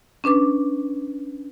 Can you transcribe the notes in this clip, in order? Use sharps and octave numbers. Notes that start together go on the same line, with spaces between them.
C#4 D4 B4 D6